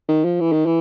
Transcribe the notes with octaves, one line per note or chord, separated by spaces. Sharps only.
D#3
F3
E3
D#3
E3